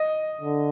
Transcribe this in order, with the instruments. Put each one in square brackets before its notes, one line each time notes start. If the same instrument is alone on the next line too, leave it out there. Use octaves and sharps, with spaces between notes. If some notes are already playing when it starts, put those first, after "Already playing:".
Already playing: [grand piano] D#5
[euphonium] D3